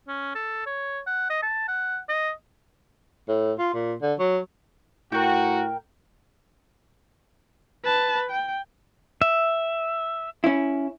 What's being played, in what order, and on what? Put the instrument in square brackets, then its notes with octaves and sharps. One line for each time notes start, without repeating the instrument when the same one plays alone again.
[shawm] C#4
A4
C#5
F#5
D#5
A5
F#5
D#5
[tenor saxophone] A2
F4
A#2
D3
F#3
[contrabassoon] A2 [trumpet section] F#4 [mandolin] A#4 G5
[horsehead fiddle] B4 A5
G5
[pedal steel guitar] E5
[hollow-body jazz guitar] C#4 E4